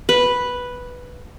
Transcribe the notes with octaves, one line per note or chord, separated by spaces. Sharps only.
B4